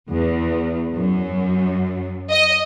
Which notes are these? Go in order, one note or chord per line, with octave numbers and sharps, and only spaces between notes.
E2
F#2
D#5